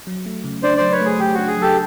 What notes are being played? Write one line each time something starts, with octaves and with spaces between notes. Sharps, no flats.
F#3
A3
C#3
D4 C5 D5
F#3 C5 D5
B4 C#5
A3 G#4
C#3 G4
D4 F#4
G#4
F#3 G4 A4